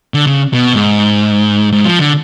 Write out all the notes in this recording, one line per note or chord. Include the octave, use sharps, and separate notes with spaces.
D3
C#3
B2
G#2
G#2
F3
D3